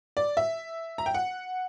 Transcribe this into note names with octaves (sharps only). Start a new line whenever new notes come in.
D5
E5
A#5
G5
F#5